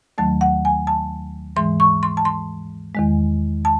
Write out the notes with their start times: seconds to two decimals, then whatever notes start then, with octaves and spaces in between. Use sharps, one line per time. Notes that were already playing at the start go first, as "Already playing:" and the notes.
0.18 D#2 D#3 F#3 A3 A5
0.41 F#5
0.65 G#5
0.87 A5
1.56 G#2 E3 G#3 C6
1.80 C#6
2.03 C6
2.17 A5
2.25 C6
2.95 E2 D#3 G#3
3.65 A5